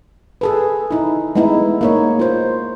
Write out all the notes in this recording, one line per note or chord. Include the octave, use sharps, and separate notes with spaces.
G#4 A4 B4
D#4 E4
G#3 A3 B3 D#4 E4
A#3 D#4 C#5
F4 C5